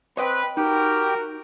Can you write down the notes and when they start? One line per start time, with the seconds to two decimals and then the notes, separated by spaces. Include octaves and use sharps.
0.17 C4 B4 C#5 D#5 G5
0.57 D#4 F#4 G4 A#4 G5